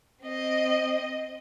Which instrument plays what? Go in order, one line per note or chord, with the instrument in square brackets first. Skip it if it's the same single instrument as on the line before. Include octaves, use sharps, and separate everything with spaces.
[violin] C4 D#5